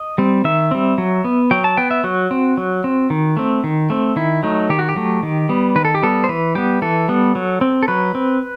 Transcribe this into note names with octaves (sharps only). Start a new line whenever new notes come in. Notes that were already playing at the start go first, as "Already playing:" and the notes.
Already playing: D#5
G3 C4
D#3 E5
G3 C4
F#3
B3
F#3 G5
A5
B3 G5
E5
F#3 F#4
C4
F#3
C4
D#3
A3 C4
D#3
A3 C4
D#3 E4
F#3 A3 D#4
D#3 G4
F#4
G4
F#3 A3
D#3
G3 B3
D#3 B4
A4
G4
G3 B3 A4
C5
E3 B4
G3 B3 G4
E3 A4
G3 B3
F#3
C4
A4
F#3 B4
C4